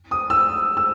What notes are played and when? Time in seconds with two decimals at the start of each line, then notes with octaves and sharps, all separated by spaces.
0.11 D#6
0.30 E6
0.77 E6